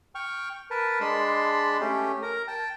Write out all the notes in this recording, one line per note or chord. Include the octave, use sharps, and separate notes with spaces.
G5 C#6 F6
A#4 B4 A5
G#3 D4 A5 B5 C6
A3 C#4 G4
A#4 A#5
G5 A5